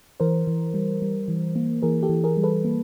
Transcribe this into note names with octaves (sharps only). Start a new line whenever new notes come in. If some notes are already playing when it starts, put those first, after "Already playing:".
E3 A#4 C5
E3
G3
G3
E3
A#3
E3 G#4 A#4
G4 A4
E3
G#4 A#4
G3
A4 B4
A#3